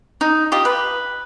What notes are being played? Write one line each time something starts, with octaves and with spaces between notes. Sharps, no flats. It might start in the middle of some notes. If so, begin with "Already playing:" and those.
D#4
F4 G4 D#5
B4